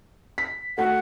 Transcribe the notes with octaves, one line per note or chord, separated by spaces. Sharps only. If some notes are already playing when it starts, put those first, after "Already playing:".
B6
A3 F#4 F#5 B6